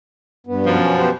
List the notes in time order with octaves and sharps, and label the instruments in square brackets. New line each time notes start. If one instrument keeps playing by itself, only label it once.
[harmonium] G2 B3
[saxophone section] F#2 B2 F3
[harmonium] C#4
B3 G4 C5